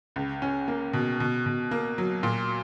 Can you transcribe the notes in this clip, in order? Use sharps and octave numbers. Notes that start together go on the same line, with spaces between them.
C#2
C#4
A#3
B2
B2
B2
A#3
F#3
A#2